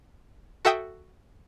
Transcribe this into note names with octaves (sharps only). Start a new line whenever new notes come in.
F#4 A4 E5 G5 D#6